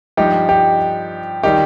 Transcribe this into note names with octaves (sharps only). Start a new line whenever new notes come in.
G2 F3 D#4 G4
D#4 G4
D#3 G3 D#4 G4